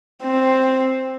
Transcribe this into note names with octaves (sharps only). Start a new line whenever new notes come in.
C4